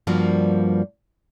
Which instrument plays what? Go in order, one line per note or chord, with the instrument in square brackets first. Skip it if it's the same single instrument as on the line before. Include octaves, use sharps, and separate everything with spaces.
[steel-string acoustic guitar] G2 F3 G3 A#3 F#4